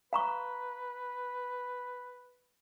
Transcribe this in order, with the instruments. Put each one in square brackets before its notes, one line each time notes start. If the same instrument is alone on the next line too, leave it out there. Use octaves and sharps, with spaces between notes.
[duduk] B4 [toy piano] F5 A#5 C#6